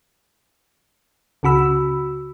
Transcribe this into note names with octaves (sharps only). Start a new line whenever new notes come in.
C#2 C#3 F#4 B5 E6